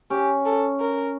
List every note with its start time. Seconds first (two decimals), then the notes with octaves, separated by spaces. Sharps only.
0.10 C#4 G4
0.45 A4
0.80 A#4